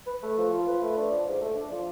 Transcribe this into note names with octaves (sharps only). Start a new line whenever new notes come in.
B4
A3
F3
F4
B4
A3
D4
F3
G#2
A3
D4
F3